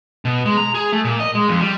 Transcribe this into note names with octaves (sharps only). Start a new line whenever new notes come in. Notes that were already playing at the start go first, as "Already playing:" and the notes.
B2
G#3
A#5
G#4
A3
A#2
D#5
G#3
F2
G3